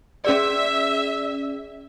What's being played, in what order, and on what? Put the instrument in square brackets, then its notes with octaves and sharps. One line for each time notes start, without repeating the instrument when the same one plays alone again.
[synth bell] C#4 G#4 D5 [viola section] E5